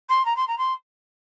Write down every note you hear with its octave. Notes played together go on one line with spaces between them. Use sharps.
C6
A#5
C6
A#5
C6